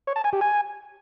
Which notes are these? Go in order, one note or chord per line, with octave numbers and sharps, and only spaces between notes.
C#5
A5
G#5
G4
G#5